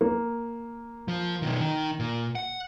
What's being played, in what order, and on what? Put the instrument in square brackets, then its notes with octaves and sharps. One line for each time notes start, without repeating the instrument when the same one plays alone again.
[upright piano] A#3
[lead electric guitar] F3
B2 D#3
D#3
A#2
F#5